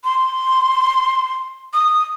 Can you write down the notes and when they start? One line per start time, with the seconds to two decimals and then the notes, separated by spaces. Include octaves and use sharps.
0.04 C6
1.74 D#6